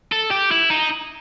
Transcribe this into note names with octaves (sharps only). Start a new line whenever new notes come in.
A4
G4
E4
D#4